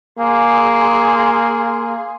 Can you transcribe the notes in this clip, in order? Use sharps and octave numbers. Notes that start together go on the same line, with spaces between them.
A#3 G#4 C6